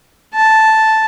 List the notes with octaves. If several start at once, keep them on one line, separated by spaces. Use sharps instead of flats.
A5